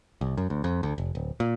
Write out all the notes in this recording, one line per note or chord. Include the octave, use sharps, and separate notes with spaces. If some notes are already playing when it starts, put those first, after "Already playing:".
C2
F#2
D2
F2
D2
F1
D1
A#2